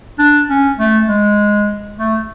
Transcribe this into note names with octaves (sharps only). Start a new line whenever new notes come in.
D4
C#4
A3
G#3
A3